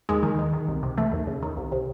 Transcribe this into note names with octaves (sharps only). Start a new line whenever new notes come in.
D#2 G#3
D#3
D#3
D#3
C2
C3
E3 A3
D#2
C#3
D#3
C2
C3